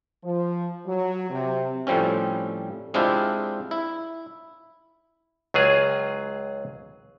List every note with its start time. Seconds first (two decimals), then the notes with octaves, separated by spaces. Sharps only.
0.24 F3
0.86 F#3
1.30 C3
1.87 A2 F3 G3 C4 C#4
2.94 G#3 C4 D4 E4 F4 G4
3.71 E4
5.54 C#2 F#3 F4 G#4